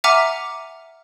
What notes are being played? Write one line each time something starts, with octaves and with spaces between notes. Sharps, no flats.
E5 F#5 G#5 A#5 D6 F6